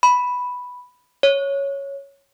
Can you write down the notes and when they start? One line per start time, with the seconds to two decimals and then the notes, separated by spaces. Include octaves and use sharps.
0.03 B5
1.23 C#5